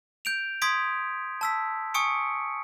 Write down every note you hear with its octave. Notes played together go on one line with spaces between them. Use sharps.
G6 D7 F7
C6 D#6 G#6 B6 D7
A5 E6 B6
G#5 C#6 D#6 C#7 D7